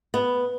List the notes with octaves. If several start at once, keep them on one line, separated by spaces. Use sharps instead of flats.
B3